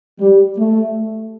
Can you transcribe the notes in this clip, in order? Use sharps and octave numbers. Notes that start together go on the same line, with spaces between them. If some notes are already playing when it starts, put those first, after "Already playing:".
G3
A3